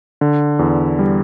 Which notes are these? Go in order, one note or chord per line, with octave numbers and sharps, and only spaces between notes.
D3
E2
G3